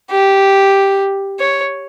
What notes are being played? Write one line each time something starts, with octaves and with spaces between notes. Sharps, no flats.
G4
C#5